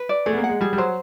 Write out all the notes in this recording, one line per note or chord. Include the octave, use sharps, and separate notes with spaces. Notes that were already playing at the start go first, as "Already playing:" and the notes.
Already playing: B4
D5
A3 G#4
B3
A#3
F#5
G#3
G3 G#4
G3
F#3 C5